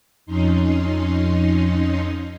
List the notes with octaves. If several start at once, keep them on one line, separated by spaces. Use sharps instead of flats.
F2 C#4 D#4 C6